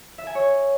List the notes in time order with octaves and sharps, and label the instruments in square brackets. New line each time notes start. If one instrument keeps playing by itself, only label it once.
[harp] E5
G#5
C#5